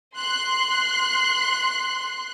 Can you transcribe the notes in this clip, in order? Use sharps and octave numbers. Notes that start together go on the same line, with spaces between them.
C6 F#6